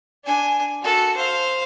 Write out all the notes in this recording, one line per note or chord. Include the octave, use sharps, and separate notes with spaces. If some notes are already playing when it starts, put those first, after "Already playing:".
D4 G#5
F#4 A4
C5 F5